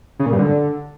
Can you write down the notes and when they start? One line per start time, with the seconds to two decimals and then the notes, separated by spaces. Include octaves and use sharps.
0.19 C#3
0.26 A#2
0.32 G2
0.39 D3